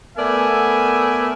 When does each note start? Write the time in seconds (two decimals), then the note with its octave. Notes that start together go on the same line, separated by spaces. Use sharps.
0.18 A3 B3 A#4 D5 E5 G#5